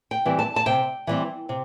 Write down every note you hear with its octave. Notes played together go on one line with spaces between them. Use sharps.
G5
E3 G3 C4
A5
A5
C3 G5
E3 G3 C4
C3